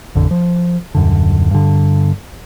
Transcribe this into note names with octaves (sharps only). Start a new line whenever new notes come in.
A1 F2 D3
F3
D#1 F#2 D3
G2 D3